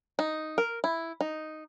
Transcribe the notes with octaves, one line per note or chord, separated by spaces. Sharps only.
D#4
A#4
E4
D#4